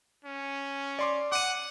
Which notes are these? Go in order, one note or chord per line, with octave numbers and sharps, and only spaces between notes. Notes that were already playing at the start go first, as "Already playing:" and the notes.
C#4
D5 C6 D6
F#5 D6 D#7